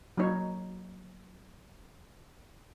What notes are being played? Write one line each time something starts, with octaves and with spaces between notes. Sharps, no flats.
F#3 A#3 D#4 C#5